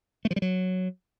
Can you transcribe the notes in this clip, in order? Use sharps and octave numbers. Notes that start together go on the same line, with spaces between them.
A3
F3
G3
F#3